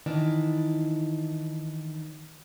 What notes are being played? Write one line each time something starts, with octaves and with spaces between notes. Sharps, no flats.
D#3 E3 D4